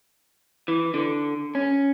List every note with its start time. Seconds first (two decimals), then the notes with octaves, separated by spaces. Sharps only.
0.68 E3
0.94 D3
1.55 C#4